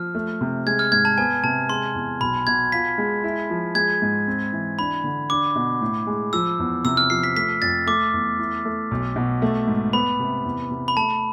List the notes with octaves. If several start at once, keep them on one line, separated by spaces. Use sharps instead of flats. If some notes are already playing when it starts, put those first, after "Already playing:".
Already playing: F3 F6
A3
C3
G#3 G#6
F6
G#2 G#6
A5
B3 G#5
C3 A5
G#3 C6
E2
B1 B5
B2 G#6
F4 B6
G#3
E4
F3
G#3 G#6
G#2
C4
E3
D4 B5
D3
D4 D6
B2
A2
G#3
F3 E6
E2
C3 E6
F6
F3 C7
B6
A3 B6
F2 A6
A3 D6
E2
E4
A3
B1
B2
A3
G#2
B3 B5
C3
E2
C3
B5
A3 A5